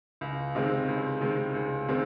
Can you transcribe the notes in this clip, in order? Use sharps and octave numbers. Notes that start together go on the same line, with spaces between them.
C#2
C3 D#3 G#3 C4
C#2
C3 D#3 G#3 C4
C#2
C3 D#3 G#3 C4